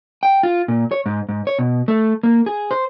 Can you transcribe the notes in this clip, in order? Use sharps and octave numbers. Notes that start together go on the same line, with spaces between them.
G5
F4
A#2
C#5
G#2
G#2
C#5
B2
A3
A#3
G#4
C5